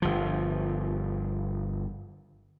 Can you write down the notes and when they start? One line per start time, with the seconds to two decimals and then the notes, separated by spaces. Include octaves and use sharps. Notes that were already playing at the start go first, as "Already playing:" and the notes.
0.02 G1 F3